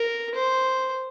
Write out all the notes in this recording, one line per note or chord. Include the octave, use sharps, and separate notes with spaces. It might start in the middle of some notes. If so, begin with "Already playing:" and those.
Already playing: A#4
C5